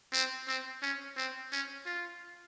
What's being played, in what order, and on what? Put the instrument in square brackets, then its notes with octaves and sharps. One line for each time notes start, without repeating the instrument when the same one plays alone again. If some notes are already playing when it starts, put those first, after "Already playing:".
[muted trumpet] C4
C4
C#4
C4
C#4
F4